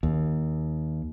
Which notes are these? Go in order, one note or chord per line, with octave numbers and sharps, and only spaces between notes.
D#2